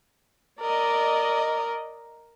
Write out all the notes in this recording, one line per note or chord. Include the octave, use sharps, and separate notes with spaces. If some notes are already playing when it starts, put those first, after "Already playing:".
A#4 D5 D#5